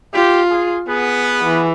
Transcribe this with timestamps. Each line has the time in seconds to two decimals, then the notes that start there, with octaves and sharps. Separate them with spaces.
0.14 F4 G4
0.50 G#4
0.88 B3 G#4
1.44 E3